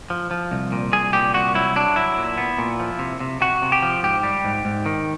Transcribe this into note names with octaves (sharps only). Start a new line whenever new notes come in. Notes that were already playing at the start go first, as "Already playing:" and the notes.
F3
F3
C2
A#2
C2 G#4
A#2 G4
C2 F#4
F#3 E4
F#3 D4
F#3 E4
A#2
B3
A#2
F3
C3
C3
C3 F#4
C3
G4
F3
G#2 G4
G3
G#2
G#2
D#3